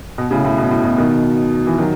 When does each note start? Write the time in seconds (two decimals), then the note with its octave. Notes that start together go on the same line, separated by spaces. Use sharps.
0.18 B2
0.31 A2 C#3
0.45 A2
0.58 B2
0.71 A2
0.84 B2
0.98 B2 D#3
1.67 E3
1.78 D#3 F#3